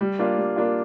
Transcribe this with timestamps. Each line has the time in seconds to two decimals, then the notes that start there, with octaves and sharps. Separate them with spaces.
0.01 G3
0.19 A#3 D4 F4
0.38 G3
0.56 A#3 D4 F4